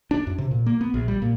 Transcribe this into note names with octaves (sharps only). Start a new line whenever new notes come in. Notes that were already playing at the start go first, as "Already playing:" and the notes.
D4
F#2
C3
A#2
A#3
B3
A#1
G3
A#2